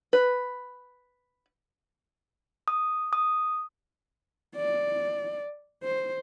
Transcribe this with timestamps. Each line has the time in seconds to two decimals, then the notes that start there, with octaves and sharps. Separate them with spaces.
0.13 B4
2.68 D#6
3.13 D#6
4.56 D5
5.83 C5